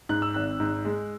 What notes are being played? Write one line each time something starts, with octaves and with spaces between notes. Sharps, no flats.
G#2 F#6
E6
G#1 F#6
G#2
G#3